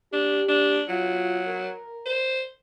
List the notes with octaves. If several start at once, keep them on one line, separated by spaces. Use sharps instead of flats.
D4 G4
D4
F#3 F4
A#4
C5